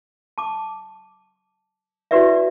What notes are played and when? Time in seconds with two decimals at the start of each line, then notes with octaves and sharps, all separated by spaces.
0.38 A5 D6
2.11 E4 F#4 G4 B4 D5 E5